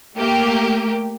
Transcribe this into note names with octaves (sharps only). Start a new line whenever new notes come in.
A3 A#3 G4 A#4